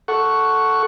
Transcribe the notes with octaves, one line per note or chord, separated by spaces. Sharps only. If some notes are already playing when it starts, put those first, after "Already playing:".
A4 F#5 C#6